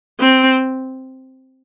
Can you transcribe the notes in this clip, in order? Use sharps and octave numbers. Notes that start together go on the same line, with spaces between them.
C4